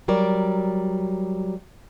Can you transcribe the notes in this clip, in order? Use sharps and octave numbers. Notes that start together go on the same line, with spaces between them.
F#3 G3 A#4 D5